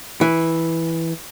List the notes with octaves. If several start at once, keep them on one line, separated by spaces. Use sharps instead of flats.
E3